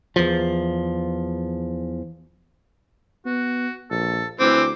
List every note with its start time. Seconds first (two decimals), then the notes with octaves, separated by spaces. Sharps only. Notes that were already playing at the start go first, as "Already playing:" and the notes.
0.16 E2 F3
3.25 B3 F#4
3.91 A#1 A4
4.40 D2 E3 C4 D6